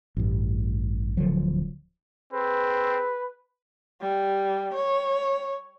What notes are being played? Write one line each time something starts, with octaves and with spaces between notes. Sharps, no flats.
A1 G2
D1 D3 F3 F#3
C4 G#4 B4
G3
C#5